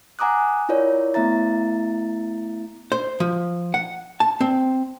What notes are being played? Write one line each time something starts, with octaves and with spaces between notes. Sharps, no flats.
F#5 G#5 A#5 D6 D#6 F#6
E4 F4 A#4 C#5 D5
A3 B3 E4 E5 A#5 A6
C5
F3
F#5
A5
C4